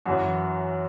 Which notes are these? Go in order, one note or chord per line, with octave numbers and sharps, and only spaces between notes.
F#2 E3 F#4